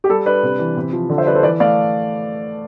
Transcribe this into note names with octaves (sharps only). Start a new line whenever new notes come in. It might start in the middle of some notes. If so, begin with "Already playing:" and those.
G4
G3 A4
D4 B4 D5
C3
E3
C3
F3
D3
C5 E5
G3 B4 D5
A4 C5
E3 B4 D5
A3 D5 F5